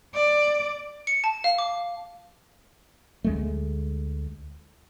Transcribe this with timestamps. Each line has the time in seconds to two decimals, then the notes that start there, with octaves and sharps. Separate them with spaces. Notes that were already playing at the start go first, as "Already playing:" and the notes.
0.15 D5
1.07 C#7
1.24 A5
1.44 F5
1.58 D6
3.24 D2 G#3 A3